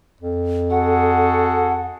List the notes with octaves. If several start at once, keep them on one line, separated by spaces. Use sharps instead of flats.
F2
F#4 G#4 A4 F#5